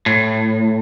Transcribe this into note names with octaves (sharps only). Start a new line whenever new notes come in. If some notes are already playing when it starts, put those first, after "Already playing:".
A2